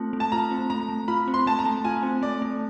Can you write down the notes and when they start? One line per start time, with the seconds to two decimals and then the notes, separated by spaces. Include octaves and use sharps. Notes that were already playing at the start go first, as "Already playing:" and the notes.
Already playing: A3 C4 F4
0.13 A3
0.20 A5
0.32 F4 A#5
0.51 C4
0.70 A3 A#5
0.89 A3
1.08 F4 B5
1.28 C4
1.34 C6
1.46 A3 A5
1.59 A#5
1.65 A3
1.85 F4 G#5
2.03 C4
2.22 A3 D5
2.42 A3